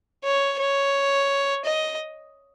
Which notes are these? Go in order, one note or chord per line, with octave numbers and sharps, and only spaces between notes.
C#5
C#5
D#5